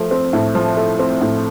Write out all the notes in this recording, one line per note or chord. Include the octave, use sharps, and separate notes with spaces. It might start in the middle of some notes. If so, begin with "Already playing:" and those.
Already playing: F3 A3
C4
A2
F3
A3
C4
A2